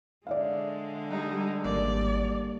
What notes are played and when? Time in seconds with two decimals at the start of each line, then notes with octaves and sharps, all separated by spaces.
0.27 D3 G#3 D5 E5 F5
1.11 G3 D#4
1.64 G#1 G3 A#3 D5